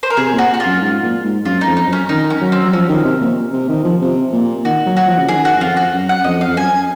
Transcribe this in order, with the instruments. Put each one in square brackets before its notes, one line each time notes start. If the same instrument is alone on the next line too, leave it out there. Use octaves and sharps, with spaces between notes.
[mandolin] C5
A#4
[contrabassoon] C3 [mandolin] G#4
[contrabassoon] A#2
[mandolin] F#4
F#4
F4
[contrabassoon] F#2
G#2
A#2
G#2
[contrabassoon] F#2 [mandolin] F4
[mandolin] D#4
[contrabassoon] F2
[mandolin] D#4
[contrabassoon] F#2
[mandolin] C#4
[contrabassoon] D#3 [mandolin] D#4
[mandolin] C#4
[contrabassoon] F#3
[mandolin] C4
[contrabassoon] F#3
[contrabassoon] F3 [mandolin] C#4
[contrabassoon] D#3
C3
A#2
C3
D#3
F3
C3
A#2
[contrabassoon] D#3 [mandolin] F#4
[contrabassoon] F#3
[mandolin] F#4
[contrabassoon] F3
C#3
[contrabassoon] D#3 [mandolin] G#4
[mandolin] F#4
[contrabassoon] F#2
[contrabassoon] F2 [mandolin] F4
[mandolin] F#4
[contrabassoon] F#2
[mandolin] F#5
[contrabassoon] F2 [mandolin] D#5
[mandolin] F5
[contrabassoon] F2
[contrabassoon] F#2 [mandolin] G#5